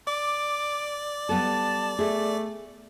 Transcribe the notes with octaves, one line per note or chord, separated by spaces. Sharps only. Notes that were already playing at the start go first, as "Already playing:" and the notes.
D5 D6
G3 B3 A4 A5
A3 G#4